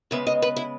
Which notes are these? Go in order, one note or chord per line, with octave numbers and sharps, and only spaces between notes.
C#3 G#3 B3 E5
D#5
B4
E4